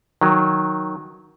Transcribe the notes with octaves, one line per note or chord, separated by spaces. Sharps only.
D#3 F#3